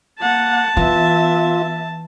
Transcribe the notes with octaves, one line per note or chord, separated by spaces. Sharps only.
A#3 F#5 A5
E3 B3 F4 E5